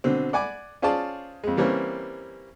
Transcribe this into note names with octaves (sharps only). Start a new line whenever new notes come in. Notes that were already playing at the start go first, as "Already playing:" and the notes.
B2 D3 C4
D5 F#5 G#5 B5 D6
C#4 F4 G#4 C5 D5 A5
F2 G#3
E3 G3 A#3 C4 C#4